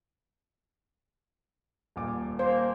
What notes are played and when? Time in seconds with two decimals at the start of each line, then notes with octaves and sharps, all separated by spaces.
1.96 D#1 A#2 D6
2.39 A#3 C5